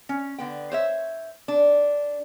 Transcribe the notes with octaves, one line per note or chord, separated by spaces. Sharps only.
C#4
D3 B3 G5
C5 C#5 E5
D4